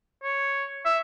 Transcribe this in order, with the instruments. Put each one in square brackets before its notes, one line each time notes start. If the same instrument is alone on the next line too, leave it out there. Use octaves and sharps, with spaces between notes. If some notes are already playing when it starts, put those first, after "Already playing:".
[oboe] C#5
E5